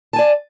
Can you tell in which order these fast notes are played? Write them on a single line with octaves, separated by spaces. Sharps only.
A5 G#5 D5